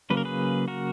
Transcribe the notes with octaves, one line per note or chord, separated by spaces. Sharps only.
C#3 F#3 A#3 B4
A#4
G#4 B4
F#4 A#4